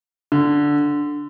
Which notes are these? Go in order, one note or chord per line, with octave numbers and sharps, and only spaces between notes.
D3